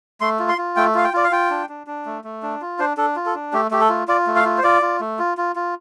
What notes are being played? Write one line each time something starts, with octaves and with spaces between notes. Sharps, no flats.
A3 C6
F4
C6
F4
A3 G5
F4 F5
G5
F4 D5
F5
F4 G5
D4
D4
D4
A3
A3
D4
F4
D4 C5
D4 A4
F4
A4
D4
A3 G4
A3 G4
A4
F4
F4 D5
A3
F5
F4
C5
F4 D5
F4
A3
F4
F4
F4